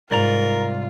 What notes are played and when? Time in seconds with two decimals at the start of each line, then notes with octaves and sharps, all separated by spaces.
0.11 C2 G#2 F4 A#4 D5 A#5